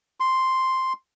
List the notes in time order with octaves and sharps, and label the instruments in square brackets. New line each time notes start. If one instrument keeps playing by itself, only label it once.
[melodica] C6